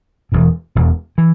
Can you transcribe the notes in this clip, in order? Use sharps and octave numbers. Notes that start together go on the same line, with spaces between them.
E1 E2 B2
E1 E2 B2
E3